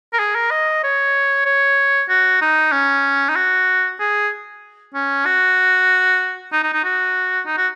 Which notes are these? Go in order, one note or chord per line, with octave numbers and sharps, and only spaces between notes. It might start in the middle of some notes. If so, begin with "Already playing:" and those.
A#4
G#4
A#4
D#5
C#5
C#5
F#4
D#4
C#4
D#4
F#4
G#4
C#4
F#4
D#4
D#4
D#4
F#4
D#4
F#4